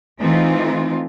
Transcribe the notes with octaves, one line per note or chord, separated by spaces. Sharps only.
E3 A3 C4 D#4 F4